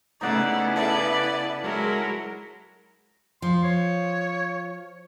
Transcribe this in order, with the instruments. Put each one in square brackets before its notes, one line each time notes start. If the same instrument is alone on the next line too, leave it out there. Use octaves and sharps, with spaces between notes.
[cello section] C#3 B3 E4 [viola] A3 D5 [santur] D#4 F#5
[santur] A4 E5 F#5 [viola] B4 D5
[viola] F#3 G#3 [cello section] E4 A#4
[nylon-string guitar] F3 [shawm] C6
[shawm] C#5